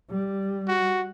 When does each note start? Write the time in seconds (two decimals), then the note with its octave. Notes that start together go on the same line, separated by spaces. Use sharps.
0.10 G3
0.68 F#4